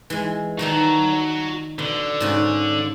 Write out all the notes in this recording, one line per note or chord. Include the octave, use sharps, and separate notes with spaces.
E3 G#3
D#3 G3 F#4 A4 A#5
B2 D3
G#2 C#3 F#4